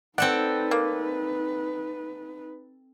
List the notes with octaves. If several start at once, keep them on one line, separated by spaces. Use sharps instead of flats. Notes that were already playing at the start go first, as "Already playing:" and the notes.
C4 D#4 A4 B4 D5 F#5
A#3